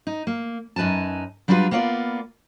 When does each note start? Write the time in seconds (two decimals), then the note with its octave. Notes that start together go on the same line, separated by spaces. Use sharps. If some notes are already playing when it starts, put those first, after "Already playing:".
0.07 D#4
0.27 A#3
0.76 F#2 D#4 B4 G#5 A5
1.48 F#3 G3 D4 F4 A4 B4
1.71 A#3 B3 F4 C#5 D5